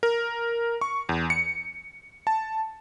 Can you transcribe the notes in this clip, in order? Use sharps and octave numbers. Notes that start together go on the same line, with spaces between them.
A#4
C#6
E2
C#7
A5